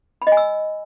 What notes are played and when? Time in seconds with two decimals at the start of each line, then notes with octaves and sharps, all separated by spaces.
0.22 B5
0.27 D#5
0.32 G#5
0.37 E6